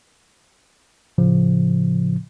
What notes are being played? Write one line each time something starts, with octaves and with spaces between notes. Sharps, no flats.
A2 C#3 F3